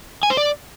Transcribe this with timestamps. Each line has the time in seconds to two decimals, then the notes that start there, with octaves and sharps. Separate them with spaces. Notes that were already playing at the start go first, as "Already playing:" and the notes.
0.23 G#5
0.30 C5
0.37 D5